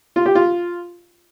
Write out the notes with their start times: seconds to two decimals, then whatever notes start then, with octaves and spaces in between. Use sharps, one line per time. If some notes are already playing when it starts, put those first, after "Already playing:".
0.16 F4
0.26 G4
0.35 F4